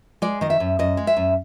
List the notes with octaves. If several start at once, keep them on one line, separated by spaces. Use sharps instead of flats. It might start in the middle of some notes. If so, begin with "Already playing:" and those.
G#3 D5
D#3 D#5
E5
F#2
F#2 D#5
G#3
E5
F#2